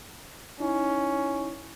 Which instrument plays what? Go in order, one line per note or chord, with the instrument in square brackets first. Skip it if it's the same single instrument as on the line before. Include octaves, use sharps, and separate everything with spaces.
[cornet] C#4 [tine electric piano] D#4 E4